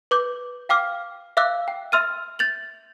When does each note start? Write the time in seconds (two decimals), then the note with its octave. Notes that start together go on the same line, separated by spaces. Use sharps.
0.11 B4 D6 G6
0.69 F5 G5 D6 F6
1.37 E5 F5 D6 E6 F#6
1.68 G5
1.92 E5 C6 E6 F6 A6 D#7
2.39 G6 A6 F7 F#7